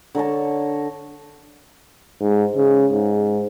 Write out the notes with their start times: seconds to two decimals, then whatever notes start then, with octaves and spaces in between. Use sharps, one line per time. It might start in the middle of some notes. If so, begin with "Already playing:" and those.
0.15 D3 A#4 C#5 A5
2.21 G#2
2.56 C#3
2.92 G#2